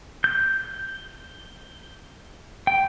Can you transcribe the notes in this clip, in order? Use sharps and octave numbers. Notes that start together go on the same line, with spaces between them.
G6
G5